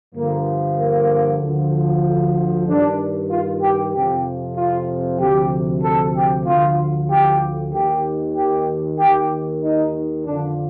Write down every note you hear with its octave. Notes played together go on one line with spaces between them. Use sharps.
G2 D3 F3 A#3
A#3
D2 D3 F3
G2 D#3 D4
F4
G4
F2 C3 F3 G4
F4
D2 C3 F3 G4
A4
G4
D2 D3 F3 F4
G4
D#2 D#3 G4
G4
D#2 D#3 G4
D#4
F2 D3 F3 D4